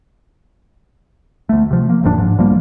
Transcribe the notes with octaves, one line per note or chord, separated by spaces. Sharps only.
D2 A3
C3 F3
A#3
E1 A2 F3 D4
G#2
B1 F3 G3 A#3